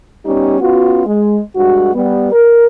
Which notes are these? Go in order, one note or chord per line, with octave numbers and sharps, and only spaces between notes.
G3 B3 C#4 D#4 G4
B3 C#4 F4 F#4
G#3
G2 G#3 F#4
G3 B3
A#4